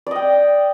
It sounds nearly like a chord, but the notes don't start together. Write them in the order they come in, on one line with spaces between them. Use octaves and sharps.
D5 D#5 G5